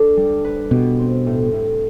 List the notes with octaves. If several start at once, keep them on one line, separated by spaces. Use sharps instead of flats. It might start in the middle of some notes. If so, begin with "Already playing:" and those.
Already playing: D4 A4
G3
B4
B2 G4
C4
A2
A2